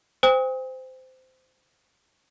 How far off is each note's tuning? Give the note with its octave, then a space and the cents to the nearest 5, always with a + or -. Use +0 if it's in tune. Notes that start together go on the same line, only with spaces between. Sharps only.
C5 -15 G5 +40 D#6 +35